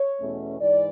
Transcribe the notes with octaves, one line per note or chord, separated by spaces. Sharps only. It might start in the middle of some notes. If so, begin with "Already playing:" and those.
Already playing: C#5
E2 B2 A3 C#4
G#2 E3 D5